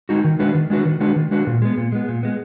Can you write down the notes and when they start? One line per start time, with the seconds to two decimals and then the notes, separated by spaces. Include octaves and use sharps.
0.09 G#3 D#4 F#4
0.24 D#3
0.39 G#3 D4 F#4 B4
0.54 D#3
0.70 G#3 D4 F#4 B4
0.85 D#3
1.00 G#3 D4 F#4 B4
1.16 D#3
1.31 G#3 D4 F#4 B4
1.47 A#2
1.62 G#3 B3
1.78 A#2
1.92 G#3 B3
2.08 A#2
2.23 G#3 B3